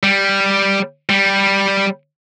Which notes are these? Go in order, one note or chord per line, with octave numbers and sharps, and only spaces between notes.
G3
G3